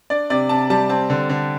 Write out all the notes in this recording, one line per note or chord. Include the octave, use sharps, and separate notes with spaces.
D4 D5
C3 D5
C3 A5
G3 A5
C4 A5
D3
D3